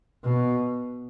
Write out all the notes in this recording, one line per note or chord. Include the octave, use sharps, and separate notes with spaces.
B2